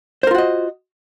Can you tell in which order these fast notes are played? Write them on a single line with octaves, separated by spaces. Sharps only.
C5 A#4 F4 F#4 D#5